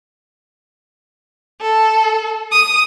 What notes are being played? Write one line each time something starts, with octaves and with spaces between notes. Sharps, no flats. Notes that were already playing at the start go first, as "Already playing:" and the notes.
A4
D#6